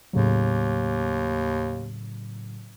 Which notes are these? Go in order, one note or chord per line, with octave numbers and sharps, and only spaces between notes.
D#2 A2 C#3 F#3